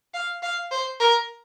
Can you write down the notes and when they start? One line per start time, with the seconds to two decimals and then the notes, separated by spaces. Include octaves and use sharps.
0.14 F5
0.43 F5
0.71 C5
1.00 A#4